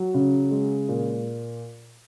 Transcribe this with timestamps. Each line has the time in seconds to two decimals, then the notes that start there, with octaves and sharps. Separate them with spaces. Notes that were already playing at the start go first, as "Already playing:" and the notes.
Already playing: F#3
0.14 C#3
0.51 G#3
0.88 A#2